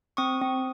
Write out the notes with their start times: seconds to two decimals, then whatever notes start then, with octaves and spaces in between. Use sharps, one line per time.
0.17 C4 C#6 D#6
0.42 C4